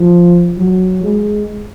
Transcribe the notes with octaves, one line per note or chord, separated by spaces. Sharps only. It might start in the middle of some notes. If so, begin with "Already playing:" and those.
Already playing: F3
F#3
G#3